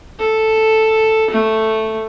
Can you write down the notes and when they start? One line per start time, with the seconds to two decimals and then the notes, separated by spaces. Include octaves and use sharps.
0.19 A4
1.31 A3